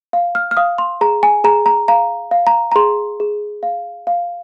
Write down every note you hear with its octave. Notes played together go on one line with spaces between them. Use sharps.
F5
F6
F6
F5 D#6
C6
G#4 A#5
G#5
G#4 A#5
A#5
F5 A#5
F5
A#5
A#5
G#4 C6
G#4
F5
F5